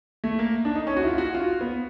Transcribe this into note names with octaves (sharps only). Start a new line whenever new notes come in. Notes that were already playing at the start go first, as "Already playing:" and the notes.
A3
A#3
D4
D#4
C#4
F#4
E4
F4
F#4
F4
B3